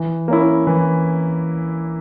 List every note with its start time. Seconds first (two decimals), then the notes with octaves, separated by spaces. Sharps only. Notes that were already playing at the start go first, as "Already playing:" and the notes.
Already playing: E3
0.28 A#3 C#4 E4
0.67 E3